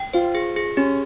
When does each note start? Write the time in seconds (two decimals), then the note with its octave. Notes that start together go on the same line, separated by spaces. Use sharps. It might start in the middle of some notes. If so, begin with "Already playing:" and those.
Already playing: G5
0.14 F4 C5
0.35 G#4
0.56 G#4
0.77 C#4 G4